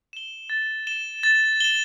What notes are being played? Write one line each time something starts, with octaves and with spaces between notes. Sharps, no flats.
E7 G7
A6
E7 G7
A6
E7 G7